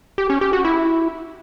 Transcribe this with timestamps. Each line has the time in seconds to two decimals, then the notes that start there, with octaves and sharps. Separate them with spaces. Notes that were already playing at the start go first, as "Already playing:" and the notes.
0.18 G4
0.30 C#4
0.41 G4
0.53 F#4
0.65 E4